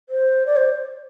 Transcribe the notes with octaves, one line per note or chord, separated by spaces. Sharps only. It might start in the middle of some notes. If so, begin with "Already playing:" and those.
C5
D5
C5